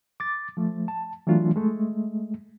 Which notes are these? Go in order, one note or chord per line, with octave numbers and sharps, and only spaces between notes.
D6 A6
F3 A3
A5
E3 F#3 A3 D4 F4
G#3 A3